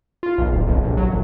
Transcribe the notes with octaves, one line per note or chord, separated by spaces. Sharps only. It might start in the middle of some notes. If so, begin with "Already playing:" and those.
F4
B1
D#1
B1
A#1
F#3
A1